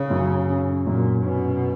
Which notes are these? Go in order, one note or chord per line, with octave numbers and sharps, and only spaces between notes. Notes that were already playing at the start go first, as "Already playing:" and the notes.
Already playing: C#3 C#4
F#2
C#4
F#2 A#2
B2 C#4